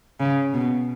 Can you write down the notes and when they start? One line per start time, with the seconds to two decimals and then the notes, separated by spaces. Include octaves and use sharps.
0.20 C#3
0.53 B2